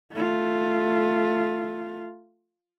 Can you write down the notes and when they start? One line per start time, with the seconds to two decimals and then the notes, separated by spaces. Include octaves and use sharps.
0.13 A3 F4